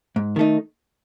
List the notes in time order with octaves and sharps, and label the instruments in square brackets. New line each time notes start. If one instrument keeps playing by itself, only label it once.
[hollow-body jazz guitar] G#2
D#3 A3 D#4